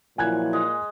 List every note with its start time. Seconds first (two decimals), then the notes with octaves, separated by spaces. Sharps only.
0.18 A#2 F3 F#3 E4 G#5 F#6 G#6
0.53 G#3